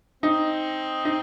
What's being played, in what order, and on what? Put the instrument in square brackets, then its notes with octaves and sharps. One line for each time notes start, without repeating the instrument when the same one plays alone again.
[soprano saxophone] C4 [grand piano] D#4
[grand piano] D#4